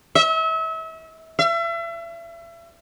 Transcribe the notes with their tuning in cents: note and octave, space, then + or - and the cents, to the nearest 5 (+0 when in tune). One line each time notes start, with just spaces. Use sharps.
E5 -35
E5 +35